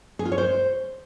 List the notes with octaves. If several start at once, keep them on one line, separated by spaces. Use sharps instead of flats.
G#4
F4
C#5
C5